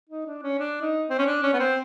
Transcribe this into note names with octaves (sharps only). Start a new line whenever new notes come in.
D#4
D4
C#4
D4
D#4
C4
C#4
D4
C#4
B3
C4